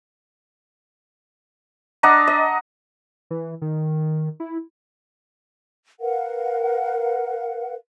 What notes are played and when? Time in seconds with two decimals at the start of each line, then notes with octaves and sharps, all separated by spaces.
2.03 D4 D#5 F#5 A#5
2.27 D#5
3.31 E3
3.62 D#3
4.40 E4
6.01 A#4 B4 F5 F#5